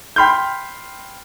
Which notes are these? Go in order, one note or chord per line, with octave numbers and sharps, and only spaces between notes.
G5 B5 C6 F6 G6